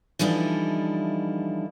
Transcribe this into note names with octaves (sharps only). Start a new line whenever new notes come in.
D3 E3 F3 G3 D#4 E4